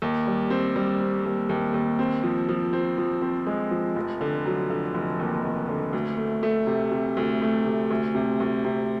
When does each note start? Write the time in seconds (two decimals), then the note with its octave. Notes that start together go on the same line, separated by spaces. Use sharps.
0.02 D#2
0.27 G3
0.50 C4
0.76 G3
1.01 C4
1.25 D#2
1.49 D#2
1.74 D#2
1.99 C4
2.23 F3
2.49 F3
2.73 C4
2.98 F3
3.22 C4
3.47 G#3
3.71 F3
3.96 F1
4.21 D3
4.46 F#3
4.70 D3
4.94 F1
5.19 D#2
5.44 F1
5.69 D3
5.93 D2
6.18 A3
6.43 A3
6.67 C3
6.92 C3
7.17 D2
7.42 A3
7.66 C3
7.91 D2
8.15 C3
8.40 D2
8.65 C3